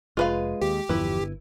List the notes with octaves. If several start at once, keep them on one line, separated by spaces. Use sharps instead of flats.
F1 G#3 F4 B4 F5
D#2 G4
G1 E2 F3 E4 B4